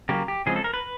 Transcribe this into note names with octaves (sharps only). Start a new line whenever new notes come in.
C#3 F#3 A#3 G4
G4
C#3 F3 G#3 C4 G#4
A4
A#4
B4